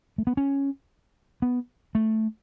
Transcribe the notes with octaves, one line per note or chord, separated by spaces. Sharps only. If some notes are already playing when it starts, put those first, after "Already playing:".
A3
B3
C#4
B3
A3